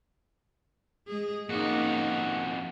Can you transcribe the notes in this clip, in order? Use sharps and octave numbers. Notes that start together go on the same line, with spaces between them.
G#3 G#4
F2 A#3 C#4 D#4 F#4